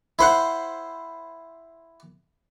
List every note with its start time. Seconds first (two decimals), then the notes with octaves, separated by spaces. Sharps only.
0.19 E4 C5 F#5